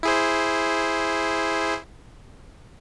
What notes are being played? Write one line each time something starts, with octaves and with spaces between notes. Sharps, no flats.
E4 G#4 C5